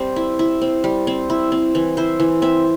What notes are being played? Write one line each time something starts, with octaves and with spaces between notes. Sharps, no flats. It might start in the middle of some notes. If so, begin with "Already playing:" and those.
Already playing: G3 C4 G4
E4
E4
C4
G3
C4
E4
C4
E3
E4 C5
E3
C4 E5